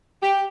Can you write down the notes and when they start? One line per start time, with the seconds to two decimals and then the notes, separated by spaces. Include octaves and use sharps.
0.23 G4